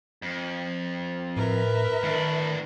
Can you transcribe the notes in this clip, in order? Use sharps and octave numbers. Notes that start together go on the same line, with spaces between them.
F2
A2 A#4 B4 E5
A2 D#3 D4